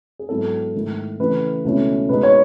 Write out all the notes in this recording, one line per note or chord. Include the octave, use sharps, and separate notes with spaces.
G#4
G#2 F#3 B3 E4 A4
G#2 D#3 A3 E4
C#3 E3 A3 E4 B4
C#2 B2 A3 C#4 E4
B2 G#3 D#4 B4
C#5